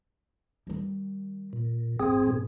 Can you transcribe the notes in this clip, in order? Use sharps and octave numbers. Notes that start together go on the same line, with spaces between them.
D#3 G3
A#2
G#1 F2 C4 G#4
G#1 B2